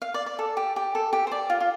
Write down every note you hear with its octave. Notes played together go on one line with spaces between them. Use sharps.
F5
D5
D5
A4
G4
G4
A4
G4
C5
D5
F4
F4